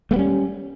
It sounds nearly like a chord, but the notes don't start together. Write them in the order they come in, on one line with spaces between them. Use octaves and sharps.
A3 B3 G3 C#4